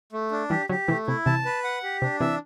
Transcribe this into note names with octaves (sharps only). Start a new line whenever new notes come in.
A3
D4
E3 G3 G4
D3 F#3 G4
C3 E3 A3
C3 E4
C3 E3 A5
B4
F#5
G4
C3 D4
C3 E3 E5